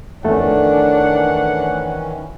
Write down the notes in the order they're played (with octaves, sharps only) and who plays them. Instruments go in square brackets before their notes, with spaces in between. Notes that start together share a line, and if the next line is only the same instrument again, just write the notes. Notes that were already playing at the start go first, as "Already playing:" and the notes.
[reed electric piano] F2 A3 A4 [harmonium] D#3 E3 C#4 [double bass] D4 [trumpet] F#5